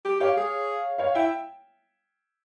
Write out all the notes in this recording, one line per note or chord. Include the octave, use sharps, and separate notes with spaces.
G4
G4 C#5 F5
G#4
C#5 F5
E4 E5 G5